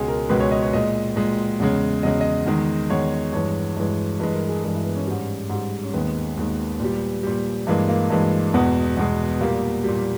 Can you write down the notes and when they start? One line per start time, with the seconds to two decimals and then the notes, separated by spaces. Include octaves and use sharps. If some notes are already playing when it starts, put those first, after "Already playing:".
Already playing: C#2 B2 G#3 G#4
0.08 A#4
0.29 C#2 B2 G#3 B4
0.40 C#5
0.51 D#5
0.63 C#5
0.73 A#2 G#3 D#5
1.16 A#2 G#3
1.60 E2 C#3 G#3
2.03 E2 C#3 G#3 D#5
2.21 D#5
2.46 E2 D#3 G#3
2.90 E2 D#3 G#3 C#5
3.33 G2 E3 G#3 C#5
3.77 G2 E3 G#3
4.20 G2 E3 G#3 B4
4.34 A#4
4.49 G#4
4.64 G2 E3 G#3
4.75 E4
4.85 B3
4.95 C#4
5.07 G#2 G3 C#4
5.50 G#2 G3
5.83 C#4
5.93 D#2 D#3 G#3 B3
6.37 D#2 D#3 G#3
6.80 A#2 G3
7.23 A#2 G3
7.67 G2 E3 G#3 A#3
7.89 A#3
8.10 G2 E3 G#3
8.54 E2 B2 G#3 B3
8.97 E2 B2 G#3
9.41 A#2 G3 A#3
9.84 A#2 G3